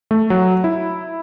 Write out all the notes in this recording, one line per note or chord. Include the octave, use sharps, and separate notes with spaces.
A3
F#3
E4